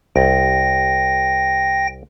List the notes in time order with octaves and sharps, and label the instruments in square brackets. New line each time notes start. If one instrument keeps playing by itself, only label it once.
[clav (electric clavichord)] C2 [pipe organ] G5 A#6